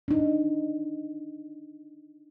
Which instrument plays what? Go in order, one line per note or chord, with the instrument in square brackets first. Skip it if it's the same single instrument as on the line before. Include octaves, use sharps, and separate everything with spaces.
[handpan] D4 D#4